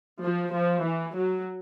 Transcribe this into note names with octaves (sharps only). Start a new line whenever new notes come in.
F3
F3
E3
F#3